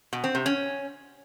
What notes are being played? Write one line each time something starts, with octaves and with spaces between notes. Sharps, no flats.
B2
C4
C3
C#4